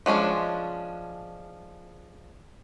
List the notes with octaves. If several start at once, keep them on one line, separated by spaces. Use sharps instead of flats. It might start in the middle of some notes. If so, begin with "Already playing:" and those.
F3 G#3 C#4 D4